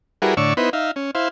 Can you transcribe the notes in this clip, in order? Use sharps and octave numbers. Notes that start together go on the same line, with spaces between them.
G3 E4 F#4 G#4 A#4 B4
A2 D3 C#5 D5 C#6 E6
B3 D#4 E4 B4 C5
D#4 E5 F5
C#4
E4 C5 F5